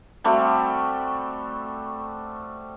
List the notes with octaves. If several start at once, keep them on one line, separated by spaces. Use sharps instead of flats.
G3 A3 C4 F#4